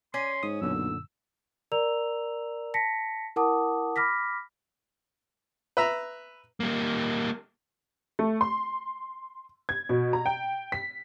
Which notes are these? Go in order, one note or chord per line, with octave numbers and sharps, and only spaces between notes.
C#4 D5 G#5 C6
G#2 D#6
B1 F#2 A#2 D3 E6
A#4 D5 A#5 E6 F7
A5 A#6 B6 C#7
E4 A#4 F#5 A5 D6 D#6
B5 D6 F6 A#6 B6
B4 E5 A#5
G3 A#3
A3
C6
G#6
B2
A#5
G5
B6